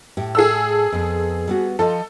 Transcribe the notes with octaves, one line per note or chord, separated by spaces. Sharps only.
A2 G4
G#4 A4 E6
F2 B3
G3 B3 F#4
F3 F4 A4 D#5